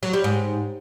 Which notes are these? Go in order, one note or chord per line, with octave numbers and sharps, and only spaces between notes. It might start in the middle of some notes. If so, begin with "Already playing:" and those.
F#3
G3
G#2